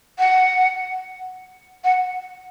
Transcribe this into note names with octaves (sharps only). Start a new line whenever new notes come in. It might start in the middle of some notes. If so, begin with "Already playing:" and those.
F#5
F#5